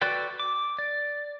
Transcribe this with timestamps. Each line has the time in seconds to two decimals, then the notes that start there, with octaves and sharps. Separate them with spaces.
0.02 F#4 A4 B4 D5 G5
0.39 D6
0.79 D5